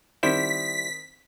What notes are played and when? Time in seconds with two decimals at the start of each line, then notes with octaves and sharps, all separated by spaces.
0.23 D#3 G3 C4 E4 C5 B6